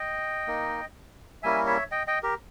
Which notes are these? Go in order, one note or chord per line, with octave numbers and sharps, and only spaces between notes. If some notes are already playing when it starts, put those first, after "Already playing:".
Already playing: D#5 G5
A#3 D#4
G3 A#3 C#4 E4 E5 G#5
C#5 E5
D#5 G5
D#5 G5
G4 A#4